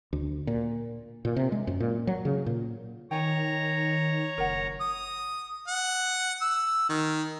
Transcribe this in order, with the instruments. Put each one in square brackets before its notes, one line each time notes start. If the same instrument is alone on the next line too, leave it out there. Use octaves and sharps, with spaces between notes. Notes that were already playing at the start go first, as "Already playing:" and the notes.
[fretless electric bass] D2
A#2
A#2
C3
G#3
F#2
A#2
F#3
C#3
A#2
[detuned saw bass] D#3 [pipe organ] C#5 A#5 [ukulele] G5 G#5
[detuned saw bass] F#1 [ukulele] A#4 F#5
[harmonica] D#6
F#5
E6
D#3